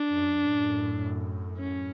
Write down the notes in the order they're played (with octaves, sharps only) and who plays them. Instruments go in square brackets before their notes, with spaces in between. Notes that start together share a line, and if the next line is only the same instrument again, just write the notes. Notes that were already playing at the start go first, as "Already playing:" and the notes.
Already playing: [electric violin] D4
[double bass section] F#2
F#2 A2
[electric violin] C#4